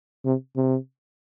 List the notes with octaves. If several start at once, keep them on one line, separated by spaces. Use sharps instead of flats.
C3
C3